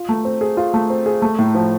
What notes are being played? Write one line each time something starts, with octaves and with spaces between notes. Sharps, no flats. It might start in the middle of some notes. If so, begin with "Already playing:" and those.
Already playing: F4
A3
C4
G#4
F4
A3
C4
G#4
A3
A2
F3